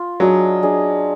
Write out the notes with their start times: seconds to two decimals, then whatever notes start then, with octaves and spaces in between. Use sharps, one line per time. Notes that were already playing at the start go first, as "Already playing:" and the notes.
Already playing: F4
0.20 F#3 D4 G#4 D#5
0.62 D4 G#4 D#5